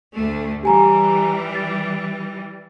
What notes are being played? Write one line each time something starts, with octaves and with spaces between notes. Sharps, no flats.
D2 A3
E3 G3 G4 G#5 A#5
A6